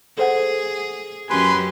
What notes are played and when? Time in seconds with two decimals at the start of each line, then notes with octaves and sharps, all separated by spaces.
0.18 G#4 A4 C5 F#5
1.29 F#2 C#4 G4 B4 G#5 C6